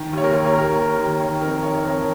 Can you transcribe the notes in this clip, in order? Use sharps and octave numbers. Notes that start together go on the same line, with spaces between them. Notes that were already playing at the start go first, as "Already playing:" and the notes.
Already playing: D#3
D#2 C#5
A#4
D#2
C#5
D#2 A#4
D#2
D#3
D#3 C#5
F2 A#4
D#3 C#5
C#5
F2 A#4